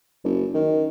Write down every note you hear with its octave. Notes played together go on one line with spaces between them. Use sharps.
F#1
D#3